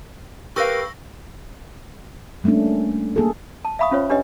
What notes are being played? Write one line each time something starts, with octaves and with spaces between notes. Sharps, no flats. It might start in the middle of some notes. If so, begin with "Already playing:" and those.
G4 A#4 B4 F5 C#6 E6 A#6
G3 A3 A#3 C#4 D4
A#3 G#4 A4
A5
E5 F5 B5 C#6 D#6
C#4 F4 C5 C#5
C#4 D4 G4 B4 C#5 D#5